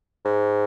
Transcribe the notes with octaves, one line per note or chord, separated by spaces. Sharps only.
G#2